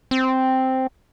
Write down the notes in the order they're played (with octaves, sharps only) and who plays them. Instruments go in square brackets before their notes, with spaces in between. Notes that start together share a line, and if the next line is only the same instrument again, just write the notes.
[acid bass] C4